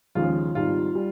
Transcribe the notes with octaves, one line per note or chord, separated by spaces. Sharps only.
D#2 C#3 F3 G#3 F4
G#1 G#2 G3 F4
G3